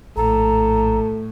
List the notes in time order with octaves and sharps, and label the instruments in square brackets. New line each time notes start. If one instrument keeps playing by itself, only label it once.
[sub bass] A#1 [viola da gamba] A2 [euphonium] A4 [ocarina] A#5